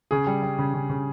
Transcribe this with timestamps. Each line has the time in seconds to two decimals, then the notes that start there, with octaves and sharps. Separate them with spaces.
0.11 C#3 G#4
0.27 G3
0.43 G3
0.59 C#3
0.74 C#3
0.89 C#3